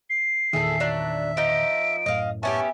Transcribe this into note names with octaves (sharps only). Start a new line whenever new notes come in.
C7
E2 A#2 D#3 G#4 A4 E5
F#3 D4
F3 D#4 D7
F#2 A2 D#5 F5
B3 C#4 G4 E5 G#5 A5 C#6